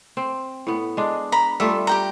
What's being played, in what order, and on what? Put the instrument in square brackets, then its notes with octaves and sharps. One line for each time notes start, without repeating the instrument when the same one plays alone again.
[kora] C4
A2 B3
G#3 D4
[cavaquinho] A#5 B5
[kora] G3 A3 F4 [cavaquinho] E5
[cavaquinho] G4 G5 A#5